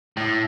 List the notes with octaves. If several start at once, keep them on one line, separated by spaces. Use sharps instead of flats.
A2